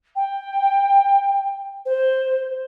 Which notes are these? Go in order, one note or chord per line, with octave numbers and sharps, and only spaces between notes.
G5
C5